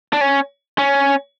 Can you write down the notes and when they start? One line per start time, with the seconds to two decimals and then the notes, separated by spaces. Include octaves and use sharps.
0.13 D4
0.21 C#4
0.79 C#4